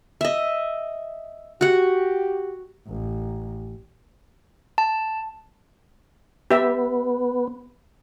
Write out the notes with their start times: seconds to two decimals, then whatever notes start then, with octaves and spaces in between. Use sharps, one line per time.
0.21 D#5 E5
1.61 F#4 G4 F#5
2.88 A1
4.78 A5
6.51 B3 G4 E5